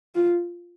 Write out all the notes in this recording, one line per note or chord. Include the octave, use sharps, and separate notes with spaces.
F4